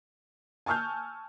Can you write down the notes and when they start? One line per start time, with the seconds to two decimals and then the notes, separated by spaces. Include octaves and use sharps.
0.66 G#5 A5 C#6 E6 F6 G6